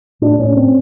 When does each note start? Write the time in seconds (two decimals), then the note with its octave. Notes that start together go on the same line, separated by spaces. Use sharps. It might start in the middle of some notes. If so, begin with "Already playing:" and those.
0.21 A2 D4
0.39 A2 C#4
0.57 A2 C4